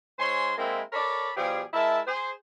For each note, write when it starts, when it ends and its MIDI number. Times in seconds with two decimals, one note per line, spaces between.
0.19 0.53 44
0.19 0.53 72
0.19 0.53 73
0.19 0.53 80
0.19 0.53 84
0.58 0.80 56
0.58 0.80 58
0.58 0.80 60
0.58 0.80 64
0.92 1.29 69
0.92 1.29 70
0.92 1.29 73
0.92 1.29 74
0.92 1.29 81
0.92 1.29 83
1.37 1.62 47
1.37 1.62 53
1.37 1.62 55
1.37 1.62 67
1.37 1.62 68
1.73 2.00 56
1.73 2.00 64
1.73 2.00 70
1.73 2.00 76
1.73 2.00 81
2.07 2.31 68
2.07 2.31 72